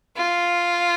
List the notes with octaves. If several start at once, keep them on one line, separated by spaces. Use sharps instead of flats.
F4